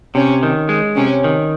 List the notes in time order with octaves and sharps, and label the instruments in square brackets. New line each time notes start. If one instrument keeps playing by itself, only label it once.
[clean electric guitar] C3 [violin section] C#4
[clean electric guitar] D#3
G#3
[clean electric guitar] C3 [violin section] C#4
[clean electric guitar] D#3